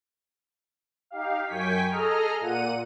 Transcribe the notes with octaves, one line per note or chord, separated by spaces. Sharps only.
D#4 G4 F5
F#2 G5 G#5 C#6 B6
G#4 A4 D#5 A#5 F6
A#2 F#5 D#7